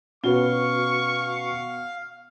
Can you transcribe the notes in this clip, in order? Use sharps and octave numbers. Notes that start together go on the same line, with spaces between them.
B2 C#4 F#4 B4 F5 C#6 G7